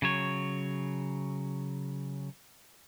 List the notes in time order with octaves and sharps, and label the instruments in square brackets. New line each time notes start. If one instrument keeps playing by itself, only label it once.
[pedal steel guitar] C#3 F#3 C#5